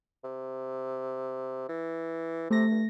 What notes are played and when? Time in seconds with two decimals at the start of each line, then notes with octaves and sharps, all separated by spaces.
0.24 C3
1.69 E3
2.50 C3 A3 A#6
2.71 G2